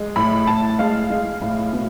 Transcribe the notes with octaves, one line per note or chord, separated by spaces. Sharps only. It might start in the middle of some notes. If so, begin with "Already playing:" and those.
Already playing: G#3
A2 B5
A2 A5
G#3 F5
G#3
A2
B2